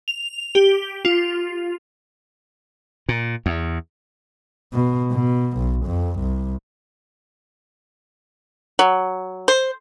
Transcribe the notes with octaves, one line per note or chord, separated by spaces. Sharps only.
F7
G4
F4
A#2
E2
B2
B2
B1
F2
C2
F#3
C5